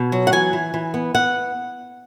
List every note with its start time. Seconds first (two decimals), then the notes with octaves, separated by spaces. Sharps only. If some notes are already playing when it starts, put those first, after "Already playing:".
Already playing: B2
0.12 F#3
0.27 F#5
0.32 E3 G#5
0.53 E3
0.74 E3
0.94 B3
1.15 B3 F#5